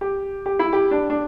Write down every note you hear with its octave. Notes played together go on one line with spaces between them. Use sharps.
G4
G4
E4
G4
D4
D4